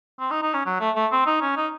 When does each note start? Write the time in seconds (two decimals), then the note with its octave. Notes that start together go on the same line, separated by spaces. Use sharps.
0.20 C4
0.31 D#4
0.43 D#4
0.54 C#4
0.66 F#3
0.80 A3
0.96 A3
1.12 C4
1.27 D#4
1.42 C#4
1.57 D#4